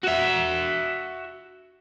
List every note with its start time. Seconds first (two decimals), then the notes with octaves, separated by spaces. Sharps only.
0.04 F#4 E5